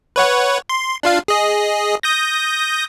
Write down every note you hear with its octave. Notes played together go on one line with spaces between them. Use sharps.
B4 C#5 F#5
C6
D4 F4 F5
G#4 D#5
D#6 G6 A#6